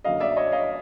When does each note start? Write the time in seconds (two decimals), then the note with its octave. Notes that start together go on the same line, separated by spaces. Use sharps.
0.04 F#1 F#2 D3 D#5 F5
0.20 D5 E5
0.37 C#5 D#5
0.52 D#5 F5